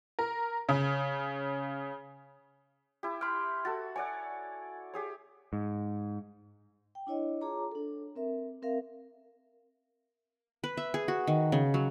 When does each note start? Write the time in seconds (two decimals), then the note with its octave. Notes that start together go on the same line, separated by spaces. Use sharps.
0.19 A#4
0.69 C#3
3.03 E4 G4
3.21 G5 C6 F6
3.65 F#4 A4 A6
3.96 C#5 D5 F#5 G#5
4.94 G4 G#4 C#5
5.53 G#2
6.95 G5
7.07 D4 E4 C#5 D#5
7.41 F4 G#4 C#5 A5 A#5 D6
7.72 D4 A4
8.16 C4 A#4 E5
8.62 C4 A#4 E5 F5
10.64 B4
10.77 E5
10.94 G#4
11.08 F#4
11.27 D#3
11.52 C#3
11.74 F#3